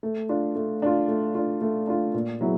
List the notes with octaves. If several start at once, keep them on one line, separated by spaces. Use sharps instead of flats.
A3
D4 F4
A3
D4 F4
A3
D4 F4
A3
D4 F4
A#2
F#3 B3 E4 G#4